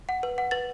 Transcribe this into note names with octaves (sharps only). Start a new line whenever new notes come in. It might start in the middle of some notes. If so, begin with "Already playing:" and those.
F#5
B4
F#5
B4 A6